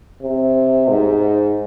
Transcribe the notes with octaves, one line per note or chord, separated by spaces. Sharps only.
C3
G#2